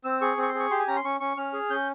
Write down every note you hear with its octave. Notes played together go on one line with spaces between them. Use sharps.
C4 E6
G#4 C#6
C4 C#6
C6
G#4
C#6
G4 C6
G#5
C#4 A#5
C6
C#4 C#6
C#4 C#6
C#4 F6
G#4
C#4 G6